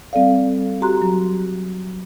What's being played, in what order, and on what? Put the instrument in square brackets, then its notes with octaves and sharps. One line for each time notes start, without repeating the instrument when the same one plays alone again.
[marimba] G3 C4 A4 D5 F5
F#4 G4 A#5 C6 F#6
F#3